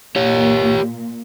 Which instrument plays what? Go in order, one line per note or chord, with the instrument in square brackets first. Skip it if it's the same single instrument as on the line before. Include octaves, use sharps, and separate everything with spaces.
[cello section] A#2 [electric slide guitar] G4 C#5